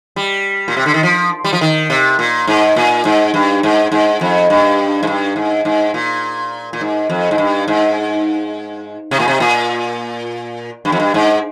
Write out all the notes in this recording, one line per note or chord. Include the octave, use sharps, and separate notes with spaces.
G3
A#2
C3
D3
D#3
F3
G3
F3
D#3
C3
A#2
G#2
A#2
G#2
G2
G#2
G#2
F2
G2
G#2
G2
G#2
G#2
A#2
A#2
G#2
F2
G#2
G2
G#2
C3
A#2
C3
A#2
G2
F2
G2
G#2